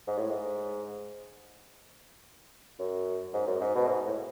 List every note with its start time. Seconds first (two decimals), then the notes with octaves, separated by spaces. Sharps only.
0.07 G#2
0.18 A2
0.30 G#2
2.79 F#2
3.33 G#2
3.47 F#2
3.61 G#2
3.74 B2
3.87 G#2
4.06 A2